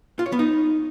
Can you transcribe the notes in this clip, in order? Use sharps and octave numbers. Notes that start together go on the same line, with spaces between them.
F4
C#5
B3
D#4